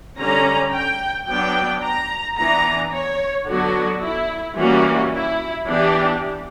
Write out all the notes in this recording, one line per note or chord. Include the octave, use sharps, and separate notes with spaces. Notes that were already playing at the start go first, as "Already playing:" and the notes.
D3 G3 C#4 A#5
G5
F#3 B3 D4 G5
A#5
E3 B3 D4 A#5
C#5
D3 F#3 B3 D4 F#4
E4
E3 G3 A#3 C#4 F#4
E4
E3 B3 D4 G4